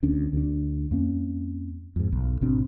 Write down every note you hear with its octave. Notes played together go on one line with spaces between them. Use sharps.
D2 C#4 D4
D2 D4
F2 A#3 C#4
F2 G#2
B1
G#1 B2 C4 D4